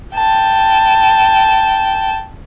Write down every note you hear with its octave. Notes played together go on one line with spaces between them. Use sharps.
G5 A5